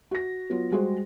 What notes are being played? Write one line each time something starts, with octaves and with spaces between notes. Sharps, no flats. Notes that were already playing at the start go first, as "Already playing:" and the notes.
F#4 A#6
F#3 B3 F4
G3 G#3 F#4 G#4 C5